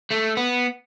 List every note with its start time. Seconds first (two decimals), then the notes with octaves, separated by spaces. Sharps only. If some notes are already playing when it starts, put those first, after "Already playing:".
0.11 A3
0.37 B3